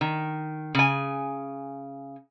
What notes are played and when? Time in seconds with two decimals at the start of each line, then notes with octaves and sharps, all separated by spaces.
0.01 D#3
0.75 C#3 G#5